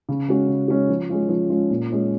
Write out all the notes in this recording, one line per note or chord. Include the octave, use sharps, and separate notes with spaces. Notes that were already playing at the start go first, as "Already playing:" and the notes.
C#3
G#3 C#4 F#4
C#3
G#3 C#4 F#4
F3
G#3 C#4 F4
F3
G#3 C#4 F4
A#2
G#3 C#4 F4